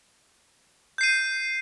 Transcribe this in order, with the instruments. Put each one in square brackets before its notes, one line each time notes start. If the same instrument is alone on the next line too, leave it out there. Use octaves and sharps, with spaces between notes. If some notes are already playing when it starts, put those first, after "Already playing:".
[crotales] G6
C7
D#7